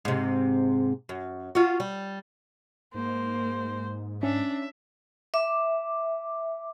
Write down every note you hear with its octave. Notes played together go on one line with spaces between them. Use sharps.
G#2 C3
F#2
F4 F#4
G3
G#2 A#3 C5
C#4 D4 E5
E5 D6